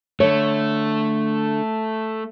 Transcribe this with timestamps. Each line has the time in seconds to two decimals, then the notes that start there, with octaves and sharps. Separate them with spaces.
0.20 D3 A3 C#5